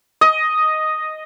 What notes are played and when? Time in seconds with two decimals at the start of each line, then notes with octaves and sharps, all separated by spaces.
0.21 D#5